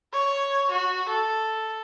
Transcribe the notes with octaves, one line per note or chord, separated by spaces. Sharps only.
C#5
F#4
A4